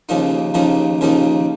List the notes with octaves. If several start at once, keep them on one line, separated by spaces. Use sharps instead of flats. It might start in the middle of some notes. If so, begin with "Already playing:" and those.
D#2 C#3 F3 A#3 D#4
D#2 C#3 F3 A#3 D#4
D#2 C#3 F3 A#3 D#4